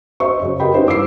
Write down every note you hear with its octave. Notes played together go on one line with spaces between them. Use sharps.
C5 D#5 E5 C#6
F#2 C#3
G4 A#4 B4 D#5 G5 B5
C#4 D#4 E4 B4 C5
G2 D6 E6 C7